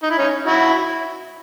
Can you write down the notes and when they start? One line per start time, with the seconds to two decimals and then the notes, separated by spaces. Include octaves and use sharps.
0.03 D#4
0.11 E4
0.18 C#4 D#4
0.47 E4 F#4